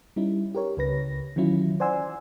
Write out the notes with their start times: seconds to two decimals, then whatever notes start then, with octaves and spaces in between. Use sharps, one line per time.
0.16 G3 C#4 D#4 E4
0.55 G4 A#4 C#5
0.77 C#2 C#3 B4 A#6
1.36 D#3 E3 F#3 C#4 E4 F4
1.80 C5 D5 F#5 G#5 C6 E6